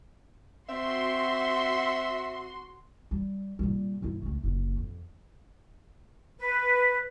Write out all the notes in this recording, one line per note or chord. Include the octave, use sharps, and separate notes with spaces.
C4 F#4 E5 C6
G3
A#2 G3
G1 E4
C#2 A3
F#1 A#2
F2
B4